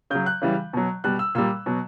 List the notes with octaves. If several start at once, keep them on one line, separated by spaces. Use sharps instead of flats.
C#3 F#3 G6
F#6
C#3 E3 G3
B2 F#3
B2 G3 F#6
E6
A#2 G3 E6
B2 F#3